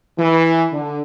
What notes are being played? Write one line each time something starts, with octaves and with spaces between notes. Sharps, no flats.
E3
D3